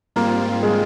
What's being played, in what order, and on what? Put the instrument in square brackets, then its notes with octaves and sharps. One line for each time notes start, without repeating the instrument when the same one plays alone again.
[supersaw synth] G#2 G3 C4 F4 [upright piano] A#3
[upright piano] G#3